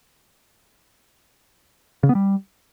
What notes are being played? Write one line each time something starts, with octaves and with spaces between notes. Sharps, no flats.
C#3
B3
G3